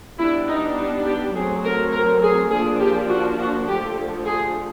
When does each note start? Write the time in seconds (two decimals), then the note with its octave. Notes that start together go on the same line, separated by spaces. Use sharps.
0.19 G3 B3 D4 E4
0.48 D#4
0.77 D#4
1.05 G4
1.35 F#3 A3 C4 G#4
1.64 A#4
1.93 A#4
2.22 G#4
2.51 F3 A#3 D4 G#4
2.80 G4
3.09 F#4
3.38 F#4
3.67 D3 F3 A3 G4
4.25 G#4